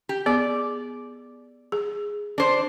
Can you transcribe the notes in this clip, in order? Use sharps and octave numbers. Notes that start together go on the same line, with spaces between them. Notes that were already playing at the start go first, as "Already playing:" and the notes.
G4
B3 G#4 D5
G#4
D4 C5